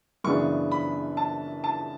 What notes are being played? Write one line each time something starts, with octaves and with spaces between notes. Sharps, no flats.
F#2 C#3 E3 B3 D4 C#6
B5
A5
A5